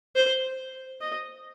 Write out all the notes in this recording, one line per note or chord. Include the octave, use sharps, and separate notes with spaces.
C5
D#5